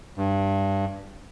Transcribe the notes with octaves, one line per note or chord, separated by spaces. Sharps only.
G2